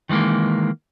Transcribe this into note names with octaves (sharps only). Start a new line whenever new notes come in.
D#3 E3 G#3 A#3